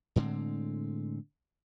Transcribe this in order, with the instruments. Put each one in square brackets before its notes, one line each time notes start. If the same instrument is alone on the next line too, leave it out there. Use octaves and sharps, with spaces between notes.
[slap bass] A2 D3 G#3 C4